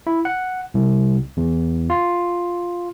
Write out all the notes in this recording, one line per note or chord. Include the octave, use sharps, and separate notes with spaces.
E4
F#5
C2
E2
F4